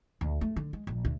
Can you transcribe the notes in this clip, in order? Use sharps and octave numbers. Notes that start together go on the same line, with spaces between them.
D2
A3
D3
G#3
A#1
D2